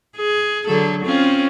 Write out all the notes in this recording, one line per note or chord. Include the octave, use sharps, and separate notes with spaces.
G#4
D3 F#3 A4
C4 C#4 F4